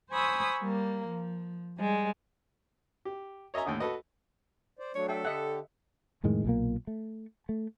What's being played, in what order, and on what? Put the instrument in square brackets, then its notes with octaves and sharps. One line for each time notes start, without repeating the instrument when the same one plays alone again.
[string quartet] C5 G#5 B5 C#6 D#6 E6
G3 A#3
F3
G3 G#3
[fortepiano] G4
C#5 D#5 E5 G#5 A#5
D#2 A2 D3 D#6
F#4 A4 B4 D#5
[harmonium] C5 D5
[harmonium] F#3 A3 D4 [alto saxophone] C#5
[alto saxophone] A4 [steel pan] E5 G5
[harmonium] D3 G4 [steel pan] D#5 E5 F#5
[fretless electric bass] F2 A2 D#3 G#3
B1 A#2 A#3
A3
A3